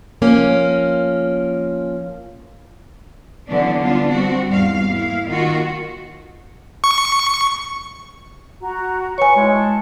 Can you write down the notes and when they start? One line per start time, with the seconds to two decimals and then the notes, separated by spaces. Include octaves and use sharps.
0.22 F3 A#3 C#4
3.47 D3 E3 F#3 B3 C#4 D4
3.81 G3 B3 D4 F4
4.09 G3 C4 F#4
4.46 E2 G#2 G3 F5
4.87 A#3 E4 F5
5.26 D#3 A#3 F4 F#4
6.84 C#6
8.62 F#4 A#5
9.18 B4 C#5 G#5 C#6
9.36 G#3 D#4 E4 G5
9.53 A5